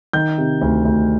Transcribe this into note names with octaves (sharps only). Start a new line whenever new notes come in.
D#3 G6
C3
D2
D2